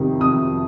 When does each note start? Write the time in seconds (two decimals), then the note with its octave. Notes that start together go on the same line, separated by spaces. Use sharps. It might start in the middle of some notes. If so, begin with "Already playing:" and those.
Already playing: F2 C3 D#3
0.20 F2 D#6